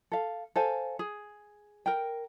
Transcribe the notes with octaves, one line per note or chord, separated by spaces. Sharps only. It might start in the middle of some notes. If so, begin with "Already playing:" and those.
A4 F5
A4 C5 F5 G#5
G#4
A#4 G5